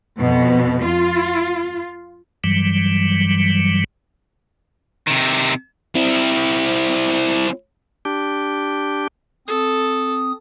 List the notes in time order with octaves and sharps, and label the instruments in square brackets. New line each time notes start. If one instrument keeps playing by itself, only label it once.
[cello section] F2 B2
F4
[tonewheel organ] G2 E3 F#3 G3
[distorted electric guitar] C3 D#3
C4 E4
[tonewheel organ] D4 G4
[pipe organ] C4 D#6 [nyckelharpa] A4